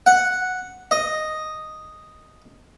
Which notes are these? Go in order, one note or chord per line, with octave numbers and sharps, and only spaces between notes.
F#5
D#5